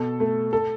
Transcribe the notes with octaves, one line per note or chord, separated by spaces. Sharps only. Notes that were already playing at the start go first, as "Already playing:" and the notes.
Already playing: B2 A4
A3
A4